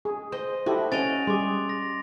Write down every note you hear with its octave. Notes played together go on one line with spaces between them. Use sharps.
G#4
C5 D#5
E4 F#4 G4 A4
C#4 D#5 F#5 A6 D7 F7
G3 G#4 C6 D6
A#6